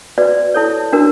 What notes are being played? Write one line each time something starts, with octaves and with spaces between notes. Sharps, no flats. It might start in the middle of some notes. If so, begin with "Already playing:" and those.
F#4 B4 D5
E4 A4 C#5
D4 F#4 A#4